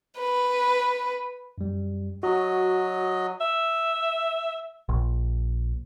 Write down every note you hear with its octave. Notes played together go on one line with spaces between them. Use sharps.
B4
F#2 G3
F#3 F#4 D#5
E5
A#1